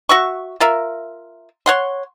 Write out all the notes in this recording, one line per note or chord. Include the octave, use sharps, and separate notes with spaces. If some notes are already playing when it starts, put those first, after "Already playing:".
F#4 E5 C#6
F4 A#4 E5
C#5 F#5 C6